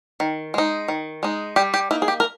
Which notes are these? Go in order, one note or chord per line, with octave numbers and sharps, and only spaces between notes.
D#3
G#3 D#4
D#3
G#3 D#4
G3 G4
G4
A#3 D#4 E4
G#4
G4
A#4